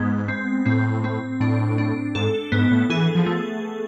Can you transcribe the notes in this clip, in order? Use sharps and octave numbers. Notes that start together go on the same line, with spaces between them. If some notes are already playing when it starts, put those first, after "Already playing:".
Already playing: G#2 G#3 B3
C4
A2 C4
C4
A2 D4
D4
G#2 A4
G#2 B3
A2
E3 G#4
F3
A3